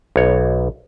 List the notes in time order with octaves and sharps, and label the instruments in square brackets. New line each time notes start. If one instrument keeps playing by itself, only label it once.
[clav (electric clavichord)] B1 C#5